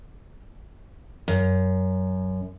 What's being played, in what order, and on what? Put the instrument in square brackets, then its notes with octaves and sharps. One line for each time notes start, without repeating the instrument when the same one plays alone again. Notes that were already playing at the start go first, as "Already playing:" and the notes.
[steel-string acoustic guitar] F#2